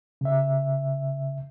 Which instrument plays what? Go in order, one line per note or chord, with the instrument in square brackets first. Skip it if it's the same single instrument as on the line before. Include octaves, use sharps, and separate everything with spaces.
[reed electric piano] C#3 E5